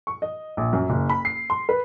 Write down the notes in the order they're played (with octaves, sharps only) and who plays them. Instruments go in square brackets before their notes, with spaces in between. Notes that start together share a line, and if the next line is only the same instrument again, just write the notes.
[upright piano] C#6
D#5
A#1
F#2
F#1
B5
C7
C6
B4